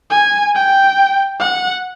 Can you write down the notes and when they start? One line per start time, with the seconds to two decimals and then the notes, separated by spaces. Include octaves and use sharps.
0.11 G#5
0.55 G5
1.40 F#5